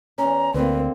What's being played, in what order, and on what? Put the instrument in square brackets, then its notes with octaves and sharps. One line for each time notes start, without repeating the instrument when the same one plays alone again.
[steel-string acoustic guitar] E2 C#4 [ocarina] A#5
[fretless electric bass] D2 [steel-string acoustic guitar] D3 A#3 [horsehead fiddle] C4 [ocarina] B4